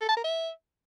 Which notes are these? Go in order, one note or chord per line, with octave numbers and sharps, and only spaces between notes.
A4
A5
A#4
E5